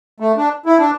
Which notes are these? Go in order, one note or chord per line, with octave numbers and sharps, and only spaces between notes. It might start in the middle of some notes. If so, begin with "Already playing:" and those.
A3
D4
E4
D4